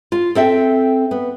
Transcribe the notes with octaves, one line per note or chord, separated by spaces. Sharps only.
F4
C4 A4 E5 G5
B3